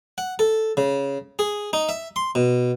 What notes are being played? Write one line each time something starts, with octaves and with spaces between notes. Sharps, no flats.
F#5
A4
C#3
G#4
D#4
E5
C6
B2